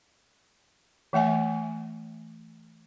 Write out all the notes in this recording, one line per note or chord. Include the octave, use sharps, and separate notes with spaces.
E3 A3 E5 G#5